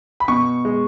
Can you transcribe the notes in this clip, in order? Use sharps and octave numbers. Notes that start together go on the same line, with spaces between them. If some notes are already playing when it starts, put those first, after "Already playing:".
B5
B2 C#6
G#3